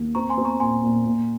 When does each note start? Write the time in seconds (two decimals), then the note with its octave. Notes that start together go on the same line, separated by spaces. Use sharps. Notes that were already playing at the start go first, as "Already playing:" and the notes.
Already playing: D#2
0.15 C4 A#5 C#6
0.30 G#5 C6
0.37 C4
0.45 A#5 C#6
0.60 A#2 G#5 C6
0.83 A#2
1.05 A#2